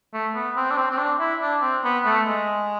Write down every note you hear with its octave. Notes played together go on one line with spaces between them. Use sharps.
A3
B3
C4
D4
C4
C4
D4
E4
D4
C4
B3
A3
G#3